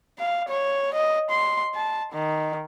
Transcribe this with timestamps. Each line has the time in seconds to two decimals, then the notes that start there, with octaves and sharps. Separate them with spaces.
0.19 F5
0.49 C#5
0.94 D#5
1.30 C6
1.75 A5
2.13 D#3